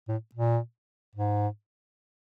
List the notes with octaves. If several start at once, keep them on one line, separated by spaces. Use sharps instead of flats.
A2
A#2
G#2